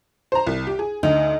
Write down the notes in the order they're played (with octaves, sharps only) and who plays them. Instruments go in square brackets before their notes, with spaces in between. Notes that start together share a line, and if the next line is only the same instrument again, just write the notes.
[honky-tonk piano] C5 A#5
C2
G4
G#4
[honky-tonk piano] D2 [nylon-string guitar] D#4